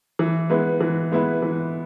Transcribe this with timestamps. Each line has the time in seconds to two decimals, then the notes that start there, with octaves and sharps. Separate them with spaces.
0.19 E3
0.50 G#3 B3 E4 B4
0.81 E3
1.11 G#3 B3 E4 B4
1.42 E3